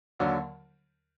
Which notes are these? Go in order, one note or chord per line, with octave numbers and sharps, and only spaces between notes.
D#2 D3 F#3